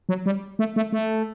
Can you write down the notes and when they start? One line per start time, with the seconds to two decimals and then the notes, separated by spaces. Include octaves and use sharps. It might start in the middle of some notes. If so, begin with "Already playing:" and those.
0.09 F#3
0.26 G3
0.59 A3
0.76 A3
0.92 A3